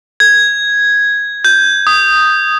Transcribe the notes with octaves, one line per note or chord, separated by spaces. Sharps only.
G#6
G6
D#6